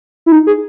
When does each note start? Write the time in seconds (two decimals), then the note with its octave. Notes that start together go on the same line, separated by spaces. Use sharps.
0.26 E4
0.32 D#4
0.47 G#4